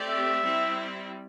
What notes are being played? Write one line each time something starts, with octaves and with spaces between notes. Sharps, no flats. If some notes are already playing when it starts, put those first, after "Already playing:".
Already playing: A3 C4 G4 D5
E5
G3 C4 E4